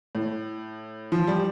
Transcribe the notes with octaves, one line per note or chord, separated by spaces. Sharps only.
A2
F3
G3